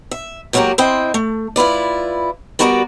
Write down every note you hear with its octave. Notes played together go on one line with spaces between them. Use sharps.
E5
G#2 F#3 A#3 E4 F#4 G4
C4 E4 C5 D#5 G5
A3
E4 F4 B4 D5
G3 B3 F#4 A#4 B4 D5